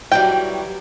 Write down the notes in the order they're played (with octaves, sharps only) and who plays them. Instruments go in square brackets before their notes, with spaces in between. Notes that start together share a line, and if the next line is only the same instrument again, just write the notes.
[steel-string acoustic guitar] E3 F#3 G3 [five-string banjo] G5